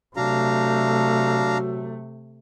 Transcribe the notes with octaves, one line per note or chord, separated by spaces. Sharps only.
C3 F#3 A3 D4 F5 A#5